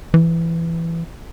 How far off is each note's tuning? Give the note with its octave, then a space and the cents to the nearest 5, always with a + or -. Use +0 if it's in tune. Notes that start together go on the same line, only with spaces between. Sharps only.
E3 +15